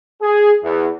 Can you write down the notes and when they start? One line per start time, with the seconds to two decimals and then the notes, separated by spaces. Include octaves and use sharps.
0.22 G#4
0.63 E2